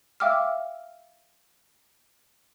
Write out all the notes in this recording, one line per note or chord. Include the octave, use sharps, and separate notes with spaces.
E5 F5 G5 D6 E6 F6